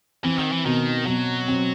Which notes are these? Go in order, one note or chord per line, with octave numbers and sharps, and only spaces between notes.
E3 C4
D#3
E3
B2 D#3
B2 F#3
C4